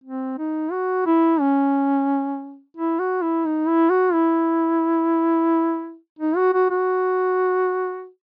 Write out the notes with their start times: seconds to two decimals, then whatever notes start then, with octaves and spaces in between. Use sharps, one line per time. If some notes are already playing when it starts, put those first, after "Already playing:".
0.04 C4
0.38 D#4
0.72 F#4
1.06 E4
1.40 C#4
2.77 E4
3.00 F#4
3.22 E4
3.45 D#4
3.68 E4
3.90 F#4
4.13 E4
6.19 D#4
6.36 F#4
6.53 F#4
6.70 F#4